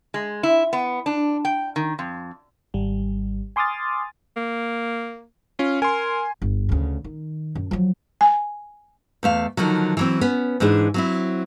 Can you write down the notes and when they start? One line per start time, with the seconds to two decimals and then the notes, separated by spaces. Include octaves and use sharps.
0.14 G#3
0.43 E4
0.73 B3
1.06 D4
1.45 G5
1.76 D#3
1.99 F2
2.74 G#1 G3
3.56 G#5 C6 D6 D#6 F6 A6
4.37 A#3
5.59 C#4 F4
5.82 A#4 G#5 C6
6.42 G1
6.69 D2 C#3
7.04 D#3
7.55 F#2
7.71 F3 F#3
8.21 G#5
9.23 E2 A3 F5
9.57 D3 D#3 F3 F#3
9.97 E3 F#3 C4
10.21 B3 C#4
10.60 G#2 E3 D4 G#4
10.94 F#3 C4 E4